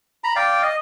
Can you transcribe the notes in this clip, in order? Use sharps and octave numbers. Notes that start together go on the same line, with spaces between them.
A#5 B5
D5 F5 G5
D#5